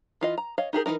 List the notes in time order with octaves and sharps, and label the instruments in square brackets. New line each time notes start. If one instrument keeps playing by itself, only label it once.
[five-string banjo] E3 F4 D#5
A#5
C#5 D#5 F5
D#4 G4 G#4 A#4
E3 C#4 D#4 A#4